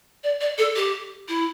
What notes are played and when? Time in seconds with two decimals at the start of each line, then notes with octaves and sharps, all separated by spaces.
0.24 D5
0.41 D5
0.58 A4
0.76 G4
1.28 E4